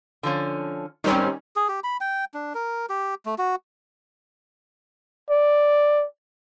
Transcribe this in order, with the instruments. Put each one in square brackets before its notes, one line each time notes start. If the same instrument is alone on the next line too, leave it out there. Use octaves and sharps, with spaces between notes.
[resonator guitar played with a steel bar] D3 F3 C#4
[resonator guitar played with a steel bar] G#2 C4 [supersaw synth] D#3 G3 C#4
[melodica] G#4
G4
B5
G5
D4
A#4
G4
A3
F#4
[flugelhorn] D5